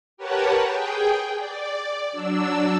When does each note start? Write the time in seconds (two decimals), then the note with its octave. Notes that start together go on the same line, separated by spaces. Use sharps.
0.17 G4 A#4 B4 C#5 F#5 A5
0.64 G#4 G5
1.38 D5
2.12 F#3 D4 E6